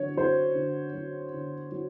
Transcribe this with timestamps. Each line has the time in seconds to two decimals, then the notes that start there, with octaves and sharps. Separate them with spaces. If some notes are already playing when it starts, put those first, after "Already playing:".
Already playing: D3 F#3 C#5
0.17 F#3 C5
0.55 D3
0.94 F#3
1.34 D3
1.72 F#3